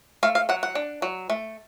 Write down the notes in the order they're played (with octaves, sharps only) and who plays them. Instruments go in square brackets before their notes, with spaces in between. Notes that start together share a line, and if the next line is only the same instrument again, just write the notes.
[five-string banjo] A3 F5
F5
F#3 F#5
F#5
D4
F#3
A3